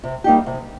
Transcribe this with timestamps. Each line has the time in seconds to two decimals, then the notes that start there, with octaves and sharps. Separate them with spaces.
0.03 C3
0.24 G3 A#3 D#4 G4
0.46 C3